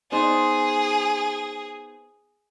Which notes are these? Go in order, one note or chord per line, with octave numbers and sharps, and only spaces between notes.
B3 D#4 G#4 C5